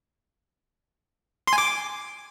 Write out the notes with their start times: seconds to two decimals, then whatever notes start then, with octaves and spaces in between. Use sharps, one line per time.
1.47 C6
1.53 G#5
1.58 D6